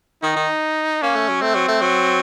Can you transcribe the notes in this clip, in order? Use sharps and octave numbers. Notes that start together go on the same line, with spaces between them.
D#3 D#4
D#3
A#3 C#4
A3
F#3
A3 C4
F#3
A3
F#3